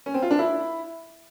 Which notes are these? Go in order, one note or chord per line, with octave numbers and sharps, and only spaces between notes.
C#4
C4
F4
D4
E4